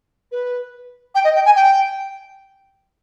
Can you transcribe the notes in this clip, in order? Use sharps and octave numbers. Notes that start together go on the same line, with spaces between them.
B4
G5
D#5
G5
G#5
G5